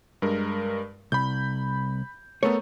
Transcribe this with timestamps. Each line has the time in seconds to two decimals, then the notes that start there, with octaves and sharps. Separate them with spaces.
0.22 G2 G#3 A#4
1.12 C2 B5 G6
2.43 A3 B3 A4 A#4 C#5